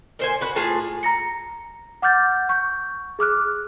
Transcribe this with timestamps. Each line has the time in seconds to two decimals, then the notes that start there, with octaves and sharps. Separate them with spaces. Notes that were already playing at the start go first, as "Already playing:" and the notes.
0.19 A#2 C5 G#5
0.41 F#4 B4
0.56 A2 F4 G#4 A5
1.03 A#5 A#6 C#7
2.02 F#5 D6 F6 G6 A6
2.49 C#6 G6
3.19 G#4 D6 F6 F#6